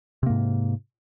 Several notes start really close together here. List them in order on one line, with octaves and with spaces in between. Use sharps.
C3 A#3 G#2